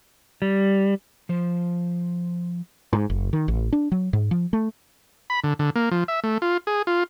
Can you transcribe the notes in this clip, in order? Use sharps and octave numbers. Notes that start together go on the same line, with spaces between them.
G3
F3 C5
G#2
F#1
D#3
A1
D4
F#3
G#2
F3
A3
B5
D3
D3
A#3
F3
E5
A3
F4
G#4
F4